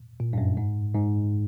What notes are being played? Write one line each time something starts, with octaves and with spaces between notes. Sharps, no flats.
A#2
G2
F#2
G#2
G#2